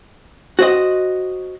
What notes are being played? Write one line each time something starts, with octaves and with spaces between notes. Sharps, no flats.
F#4 C5 D#5